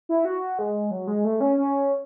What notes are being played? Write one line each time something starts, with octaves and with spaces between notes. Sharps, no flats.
E4
F#4
G#3
F#3
G#3
A3
C#4
C#4